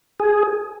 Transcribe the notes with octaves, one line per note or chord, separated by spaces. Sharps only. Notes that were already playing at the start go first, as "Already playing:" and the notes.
G#4